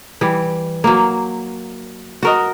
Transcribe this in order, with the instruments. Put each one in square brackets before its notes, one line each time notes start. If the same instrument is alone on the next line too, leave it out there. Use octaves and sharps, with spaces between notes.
[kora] E3 G3
F#3 A#3
F#4 A#4 D#5